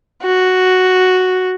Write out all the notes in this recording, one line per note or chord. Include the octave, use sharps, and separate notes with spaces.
F#4